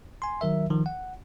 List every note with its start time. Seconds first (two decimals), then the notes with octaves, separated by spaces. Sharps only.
0.22 G#5 C6
0.41 D#3 F#3 A#4 E5
0.70 D#3 F3
0.86 F#5